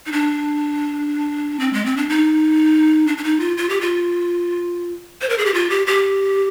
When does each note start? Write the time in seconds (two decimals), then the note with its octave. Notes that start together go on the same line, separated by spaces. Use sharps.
0.06 D#4
0.12 D4
1.60 C4
1.73 G#3
1.85 C4
1.97 D4
2.09 D#4
3.07 D4
3.17 D4
3.24 D#4
3.40 F4
3.57 F4
3.69 G4
3.81 F4
5.21 C5
5.30 A#4
5.38 G#4
5.46 G4
5.54 F4
5.70 G4
5.87 G4